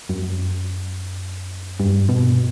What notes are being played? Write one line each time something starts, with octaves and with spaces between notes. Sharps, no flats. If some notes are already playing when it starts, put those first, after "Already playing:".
F#2
G2
B2